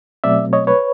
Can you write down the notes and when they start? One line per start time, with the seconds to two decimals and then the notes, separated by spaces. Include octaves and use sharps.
0.24 B2 F#3 A3 C4 D5 E5
0.53 C#5 D#5
0.67 B4 C#5